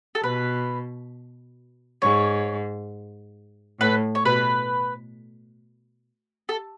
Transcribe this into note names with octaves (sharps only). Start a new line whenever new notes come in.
A4
B2 B4
G#2 C#5
A2 B4
C#5
B2 B4
A4